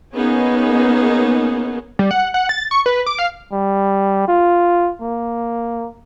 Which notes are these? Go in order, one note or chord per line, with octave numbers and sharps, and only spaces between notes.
A#3 B3 C#4 D#4 G#4
G3
F#5
F#5
A6
C#6
B4
D6
F5
G3
F4
A#3